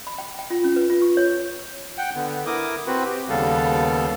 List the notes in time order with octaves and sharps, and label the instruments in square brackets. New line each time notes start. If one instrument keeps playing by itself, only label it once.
[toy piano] B5
G5
G5
F4
C#4
B4
F4
C#6
C#5
[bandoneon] F#5 G5
D3 B3
E4 A#4 D6 D#6
C4 F#4 B4
G4
D#2 C#3 G3 B3 A4 F5